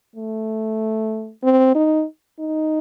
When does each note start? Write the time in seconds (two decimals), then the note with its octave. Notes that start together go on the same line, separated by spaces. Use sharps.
0.16 A3
1.43 C4
1.75 D#4
2.39 D#4